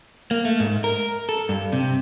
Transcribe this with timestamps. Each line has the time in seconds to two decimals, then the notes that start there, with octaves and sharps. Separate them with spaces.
0.31 A#3
0.45 A3
0.60 G#2
0.84 A#4
1.29 A4
1.49 G2
1.72 C3